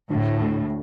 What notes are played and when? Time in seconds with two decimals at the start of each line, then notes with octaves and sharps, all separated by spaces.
0.10 D2 A2
0.40 D2